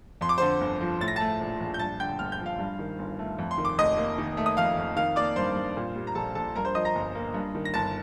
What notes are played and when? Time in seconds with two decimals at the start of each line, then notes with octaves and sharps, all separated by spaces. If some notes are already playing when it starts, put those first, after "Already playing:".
0.21 F2 C6
0.29 D6
0.38 D3 C5 C6
0.61 G1
0.81 F3
1.00 A2 A6
1.08 A#6
1.16 A3 A5 A6
1.41 A#1
1.61 A#1
1.74 G6
1.79 G2 A5 A6
2.00 D3 G5 G6
2.19 G1 F6
2.32 G6
2.40 F3
2.46 F5 F6
2.59 G2
2.79 D#3
2.99 G1
3.19 A3
3.38 F2
3.51 C6
3.58 D#3
3.65 D6
3.78 F1 D#5 D#6
3.97 A#3
4.18 D#3
4.37 A3
4.46 D#6
4.57 F2 F5 F6
4.77 F2
4.96 D#3 F5 F6
5.16 A#3 D5 D6
5.36 G2 C5 C6
5.56 G2
5.77 A#2
5.95 G3
6.07 A#5
6.15 A#1 A4 A5
6.35 A#1 A4 A5
6.55 G2 A#4 A#5
6.65 C5 C6
6.75 F3 D#5 D#6
6.85 A#5 A#6
6.95 G1
7.15 A#3
7.34 G2
7.55 D#3
7.65 A#6
7.74 G1 A5 A6